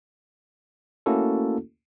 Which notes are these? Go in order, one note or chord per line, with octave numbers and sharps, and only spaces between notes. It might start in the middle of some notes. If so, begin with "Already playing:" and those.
A3 A#3 C#4 E4 F#4 A4